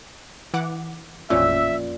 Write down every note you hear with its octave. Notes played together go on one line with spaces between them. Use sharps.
E3 F#5 D6
A1 F2 A#2 C#4 E5 E6